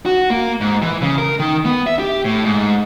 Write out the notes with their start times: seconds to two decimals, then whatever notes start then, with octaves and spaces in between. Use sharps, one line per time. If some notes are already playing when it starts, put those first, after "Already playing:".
0.06 F#4
0.30 A#3
0.61 G#2
0.82 E3
1.02 C#3
1.18 A#4
1.40 D#3
1.65 B3
1.87 E5
1.99 G4
2.25 A2
2.44 G#2